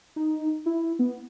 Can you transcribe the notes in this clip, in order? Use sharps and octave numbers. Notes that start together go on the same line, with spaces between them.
D#4
E4
B3